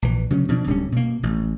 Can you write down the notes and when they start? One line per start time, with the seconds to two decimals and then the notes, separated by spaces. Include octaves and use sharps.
0.02 A#1 E3
0.30 C#3 F#3 C4 C#4
0.48 B2 F3 C4 D4
0.67 D1 D3 G3 C#4
0.92 B2 A#3
1.23 A1